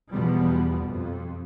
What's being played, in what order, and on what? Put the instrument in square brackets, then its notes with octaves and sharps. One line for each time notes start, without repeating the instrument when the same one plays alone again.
[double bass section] E2 B2 F3 G3 B3
F2